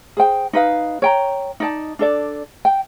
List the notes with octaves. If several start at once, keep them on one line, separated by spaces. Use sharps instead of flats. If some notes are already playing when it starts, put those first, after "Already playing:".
G#4 C5 G5
D#4 B4 F5
C#5 G5 A#5
D#4 D5 A5
D4 A4 D5
G5